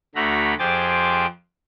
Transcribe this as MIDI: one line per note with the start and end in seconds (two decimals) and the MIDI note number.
0.15 0.54 38
0.15 0.54 50
0.15 0.54 57
0.15 0.54 66
0.15 0.54 82
0.15 0.54 83
0.59 1.26 41
0.59 1.26 67
0.59 1.26 68
0.59 1.26 72
0.59 1.26 86
0.59 1.26 93